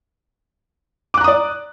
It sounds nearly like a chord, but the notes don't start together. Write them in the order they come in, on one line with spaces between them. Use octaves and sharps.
D6 F#6 A#5 D#6 D5